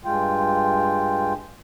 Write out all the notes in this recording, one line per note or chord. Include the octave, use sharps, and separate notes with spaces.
G2 G#3 F4 G5